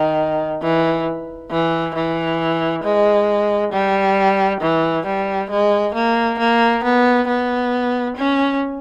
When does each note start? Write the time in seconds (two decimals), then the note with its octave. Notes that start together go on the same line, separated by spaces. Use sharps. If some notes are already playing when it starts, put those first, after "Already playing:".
Already playing: D#3
0.62 E3
1.51 E3
1.95 E3
2.83 G#3
3.72 G3
4.61 E3
5.06 G3
5.50 G#3
5.94 A#3
6.39 A#3
6.83 B3
7.28 B3
8.16 C#4